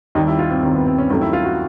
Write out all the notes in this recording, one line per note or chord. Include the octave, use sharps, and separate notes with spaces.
D#2 D#3 G3 D#4
E4
F4
C4
D#2 D#3 G3 C4
B3
C4
C#4
D#2 D#3 F#3 A3 C#4
E4
F4
F#4